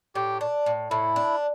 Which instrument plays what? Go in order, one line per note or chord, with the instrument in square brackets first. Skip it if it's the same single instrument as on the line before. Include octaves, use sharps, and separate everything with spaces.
[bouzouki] A2 [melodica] G4
[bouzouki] D4
A2
[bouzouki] A2 [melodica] E4
[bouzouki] D4